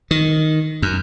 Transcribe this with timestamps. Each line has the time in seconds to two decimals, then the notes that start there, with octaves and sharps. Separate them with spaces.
0.11 D#3
0.82 F#2